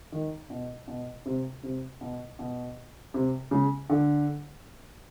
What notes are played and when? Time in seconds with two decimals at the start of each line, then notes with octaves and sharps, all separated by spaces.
0.12 D#3
0.50 B2
0.87 B2
1.26 C3
1.63 C3
2.01 B2
2.39 B2
3.14 C3
3.51 C#3
3.90 D3